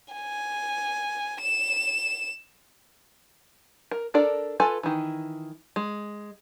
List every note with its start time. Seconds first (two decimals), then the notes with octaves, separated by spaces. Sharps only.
0.14 G#5
1.42 E7
3.91 A#4
4.14 D4 A4 A#4 D5
4.60 F4 A4 B4 G#5
4.83 D#3 E3
5.76 G#3